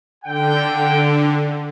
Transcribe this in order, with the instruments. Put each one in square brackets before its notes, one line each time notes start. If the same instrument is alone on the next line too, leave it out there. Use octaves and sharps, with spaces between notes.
[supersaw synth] D3 [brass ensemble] G5